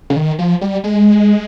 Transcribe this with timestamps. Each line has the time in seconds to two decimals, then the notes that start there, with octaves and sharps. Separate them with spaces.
0.10 C#3
0.16 D#3
0.39 F3
0.61 G3
0.84 G#3